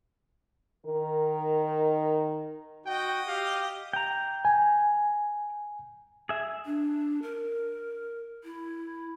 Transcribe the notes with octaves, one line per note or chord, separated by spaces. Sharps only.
D#3 D#4 A#4
F#4 D#5 G5
G4 F5
G5 A#5
G#5
G#4 E5
D4
A#4
E4